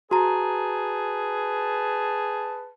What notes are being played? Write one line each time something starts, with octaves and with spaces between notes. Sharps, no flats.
F#4 G#4 B4 A5 A#5